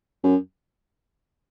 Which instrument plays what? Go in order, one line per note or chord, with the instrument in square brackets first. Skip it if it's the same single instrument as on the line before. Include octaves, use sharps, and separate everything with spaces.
[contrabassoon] F#2